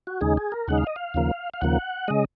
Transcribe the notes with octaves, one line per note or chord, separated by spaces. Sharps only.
F#4
D#2 C#3 G#3 D#4 G#4
G#4
A#4
D#2 C#3 G#3 D#4 F#5
F5
D#5
F5
D#2 C#3 F3 A#3
F5
D#2 C#3 F3 A#3 F#5
C#3 G#3 D#5